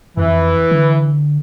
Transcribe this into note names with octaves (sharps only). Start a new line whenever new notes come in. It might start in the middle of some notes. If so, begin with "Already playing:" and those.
F2 E3
D3